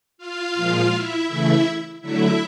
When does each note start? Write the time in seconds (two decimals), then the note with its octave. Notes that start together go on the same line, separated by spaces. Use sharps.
0.18 F4 F5
0.55 A#2 F3 G#3
0.91 E4 E5
1.28 C#3 E3 A3 E4 E5
2.01 D3 F#3 A3 E4 E5